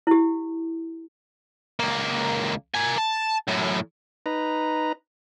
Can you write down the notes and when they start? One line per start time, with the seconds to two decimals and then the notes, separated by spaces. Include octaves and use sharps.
0.07 E4 G4
1.80 C#2 A#3
2.74 A#3 G#5
2.98 A5
3.48 F#2 A2
4.26 D#4 B4 A#5